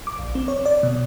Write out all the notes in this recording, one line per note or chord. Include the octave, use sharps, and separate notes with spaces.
D6
A#1
C4
C#5
D5
B2